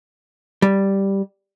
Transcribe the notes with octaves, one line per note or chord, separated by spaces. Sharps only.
G3